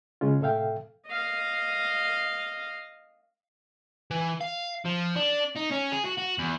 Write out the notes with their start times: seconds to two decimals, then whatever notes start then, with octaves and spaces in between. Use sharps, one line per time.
0.21 C#3 G#3 C#4 F4
0.41 A2 C3 A4 E5 F5 G5
1.07 D#5 F5
4.11 E3
4.41 F5
4.85 F3
5.16 D4
5.55 D#4
5.71 C#4
5.92 G#4
6.05 F#4
6.18 F#4
6.38 E2